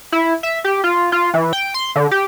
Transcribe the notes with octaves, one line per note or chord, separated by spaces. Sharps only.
E4
E5
G4
F4
F4
E3
G5
C6
D3
G4